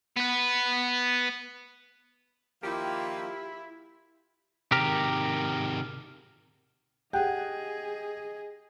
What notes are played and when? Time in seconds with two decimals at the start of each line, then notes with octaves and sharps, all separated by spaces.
0.16 B3 B4
2.63 D#3 F3 A#3 E4 F4 G4
4.72 C3 D#3 G4 A#4
7.13 G4 G#4 D#5 F#5 G5 F#6